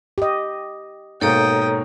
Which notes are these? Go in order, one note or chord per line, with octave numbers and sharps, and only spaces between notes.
G4 D#5
G#2 B2 A#3 A4 C#5 G5 A#5 D#6